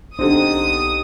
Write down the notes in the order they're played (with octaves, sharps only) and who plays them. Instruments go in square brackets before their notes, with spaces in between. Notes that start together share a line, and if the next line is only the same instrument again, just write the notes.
[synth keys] B1 [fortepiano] D3 C4 [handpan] D#4 G4 [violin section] D#6